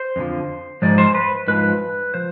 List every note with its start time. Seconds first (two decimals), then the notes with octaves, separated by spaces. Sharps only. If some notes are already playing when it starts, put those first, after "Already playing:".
Already playing: C5
0.16 F2 D3 F3
0.82 G#2 F3 D5
0.98 C5
1.15 B4
1.48 G#2 F3 B4
2.14 F3 C5